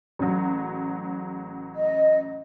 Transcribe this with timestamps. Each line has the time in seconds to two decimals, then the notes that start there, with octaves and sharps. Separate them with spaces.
0.19 A1 C#3 F#3
1.75 D#5